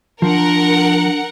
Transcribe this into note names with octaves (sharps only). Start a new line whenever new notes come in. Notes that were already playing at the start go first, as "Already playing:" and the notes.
F3 D4 A#4 F#5